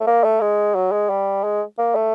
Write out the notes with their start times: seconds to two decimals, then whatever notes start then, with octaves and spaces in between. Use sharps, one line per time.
0.01 A3
0.07 A#3
0.24 A3
0.41 G#3
0.75 F#3
0.92 G#3
1.10 G3
1.44 G#3
1.78 A#3
1.95 A3